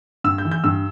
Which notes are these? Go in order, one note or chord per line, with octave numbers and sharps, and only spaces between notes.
G2 E6
G6
E3
G6
G2 E6